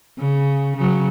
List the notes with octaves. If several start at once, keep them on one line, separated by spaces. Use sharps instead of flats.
C#3
C#3 F#3